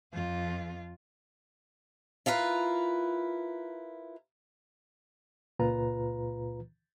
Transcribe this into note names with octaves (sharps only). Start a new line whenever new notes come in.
F2 F4
E4 F4 A#4 B4
C#2 A#2 F4 B4 A#5